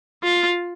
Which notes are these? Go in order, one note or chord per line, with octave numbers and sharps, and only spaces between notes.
F4